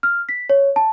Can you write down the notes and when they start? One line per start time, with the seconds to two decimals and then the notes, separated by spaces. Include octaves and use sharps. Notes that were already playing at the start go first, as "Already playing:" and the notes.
0.03 F6
0.29 B6
0.50 C#5
0.76 A5